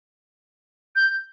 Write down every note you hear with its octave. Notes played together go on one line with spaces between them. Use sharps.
G6